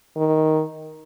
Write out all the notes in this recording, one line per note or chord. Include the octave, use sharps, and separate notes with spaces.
D#3